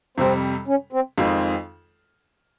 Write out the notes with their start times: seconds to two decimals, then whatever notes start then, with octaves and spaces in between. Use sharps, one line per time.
0.18 F2 C3 G3 C4
0.68 C#4
0.93 C4
1.18 F2 D#3 G#3 C4 F4